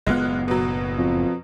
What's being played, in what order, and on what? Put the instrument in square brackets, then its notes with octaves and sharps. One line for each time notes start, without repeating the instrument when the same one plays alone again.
[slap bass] F#1 A2 B3 [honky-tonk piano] G#3 F4 F#6
[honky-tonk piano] B2 F#3
[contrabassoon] F2